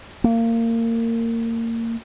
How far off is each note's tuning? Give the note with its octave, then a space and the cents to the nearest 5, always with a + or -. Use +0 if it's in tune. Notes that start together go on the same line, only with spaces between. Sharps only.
A#3 -25